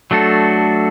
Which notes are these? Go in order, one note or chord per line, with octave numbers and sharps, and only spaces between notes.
F#3 A3 D4 F#4 A4